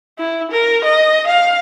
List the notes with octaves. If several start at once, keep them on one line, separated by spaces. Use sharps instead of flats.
E4
A#4
D#5
F5